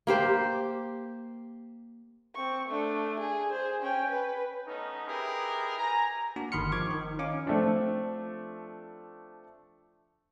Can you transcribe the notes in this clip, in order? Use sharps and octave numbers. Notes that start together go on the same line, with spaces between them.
A#3 G4 C5
C4 C#6
A3 D4
G#4
G#4 C5
C#4 G5
B4
A3 B3 C#4 D#4
D#4 E4 G4 G#4 A#4 B4
G#5 A#5
A#3 D4 F#4 D5
G1 D#3 B5 C6 F6 C#7
D#3 F3 C#6 D6 G#6
D#3
C#4 D#4 F5 D6
F3 A3 C4 D4 F4